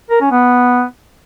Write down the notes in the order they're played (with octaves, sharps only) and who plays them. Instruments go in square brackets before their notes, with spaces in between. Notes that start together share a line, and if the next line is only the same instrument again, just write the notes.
[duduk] A#4
C#4
B3